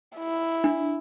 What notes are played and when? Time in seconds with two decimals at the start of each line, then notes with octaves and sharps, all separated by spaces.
0.18 E4
0.64 D4